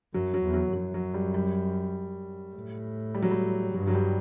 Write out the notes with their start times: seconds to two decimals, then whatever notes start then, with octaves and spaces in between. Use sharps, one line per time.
0.14 F#2 F#3
0.34 F#3
0.44 E2
0.54 F#3
0.73 F#2 F#3
0.94 F#3
1.14 G3
1.34 G3
2.54 A2
3.14 G3
3.22 F#3
3.31 G3
3.74 G2 F#3
3.87 F#3
3.95 G3